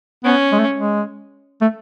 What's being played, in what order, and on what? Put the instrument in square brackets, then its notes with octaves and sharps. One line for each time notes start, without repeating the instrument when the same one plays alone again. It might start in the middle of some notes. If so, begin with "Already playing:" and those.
[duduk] B3 [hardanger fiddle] C#4
[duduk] G#3
A3
G#3
A3